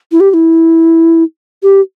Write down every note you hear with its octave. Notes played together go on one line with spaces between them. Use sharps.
E4
G4
G4
E4
G4